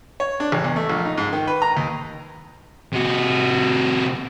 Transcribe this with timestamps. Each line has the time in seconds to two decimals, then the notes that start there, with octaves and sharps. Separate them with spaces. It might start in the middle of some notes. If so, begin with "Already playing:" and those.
0.20 C#5
0.40 D4
0.52 A1
0.64 E2
0.76 A3
0.90 A#1
1.05 D#4
1.18 G#2
1.33 D#3
1.47 B4
1.62 A#5
1.77 D#2
2.93 C3 F#4